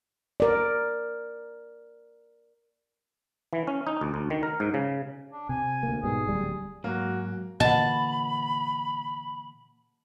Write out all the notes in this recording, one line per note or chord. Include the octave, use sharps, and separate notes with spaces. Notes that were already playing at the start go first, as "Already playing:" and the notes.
A#4 D5
E3
C#4
D#4
D2
D2
D#3
A#4
G#2
C#3
D4
C3 G#5
D2 A#3
G#2 B2 G3 G#4
D1 G3
G#2 F#3 A#3 F#4
A#2 D3 E3 D#5 F#5 A5 B5